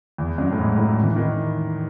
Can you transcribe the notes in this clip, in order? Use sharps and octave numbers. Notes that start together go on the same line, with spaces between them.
E2
F#2
A2
G#2
A2
E3
D#3